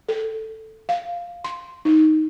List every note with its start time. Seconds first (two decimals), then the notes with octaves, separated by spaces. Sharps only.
0.09 A4
0.89 F5
1.44 C6
1.85 D#4